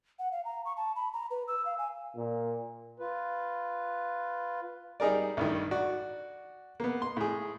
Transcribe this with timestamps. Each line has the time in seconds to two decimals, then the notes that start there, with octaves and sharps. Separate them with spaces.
0.19 F#5
0.32 F5
0.45 A#5
0.65 C#6
0.77 A5
0.96 B5
1.13 A#5
1.31 B4
1.48 E6
1.66 F5
1.78 G#5
2.16 A#2
3.00 F4 B4
5.00 G3 D#4 G#4 A#4 D5
5.37 A1 G2 D#3
5.71 F#4 D5
6.80 A#3 B3
7.02 C6
7.17 A2 G#4